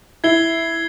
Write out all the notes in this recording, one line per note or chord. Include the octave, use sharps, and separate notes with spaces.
E4 G#6 C7 G7